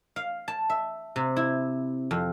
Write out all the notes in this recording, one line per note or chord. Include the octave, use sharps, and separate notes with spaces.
F5
A5
E5
C3
E4
F2